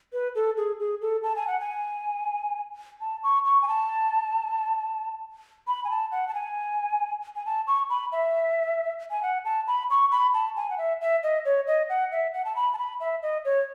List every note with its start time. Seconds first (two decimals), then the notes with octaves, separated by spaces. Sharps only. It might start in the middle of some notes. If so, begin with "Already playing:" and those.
0.13 B4
0.35 A4
0.57 G#4
0.80 G#4
1.01 A4
1.23 A5
1.36 G#5
1.47 F#5
1.60 G#5
3.01 A5
3.24 C#6
3.45 C#6
3.62 G#5
3.68 A5
5.68 B5
5.84 G#5
5.90 A5
6.12 F#5
6.28 A5
6.34 G#5
7.36 G#5
7.46 A5
7.67 C#6
7.90 B5
8.12 E5
9.11 G#5
9.23 F#5
9.45 A5
9.67 B5
9.90 C#6
10.11 B5
10.34 A5
10.56 G#5
10.70 F#5
10.78 E5
11.01 E5
11.23 D#5
11.45 C#5
11.67 D#5
11.89 F#5
12.12 E5
12.34 F#5
12.45 A5
12.56 B5
12.73 A5
12.78 B5
13.00 E5
13.22 D#5
13.45 C#5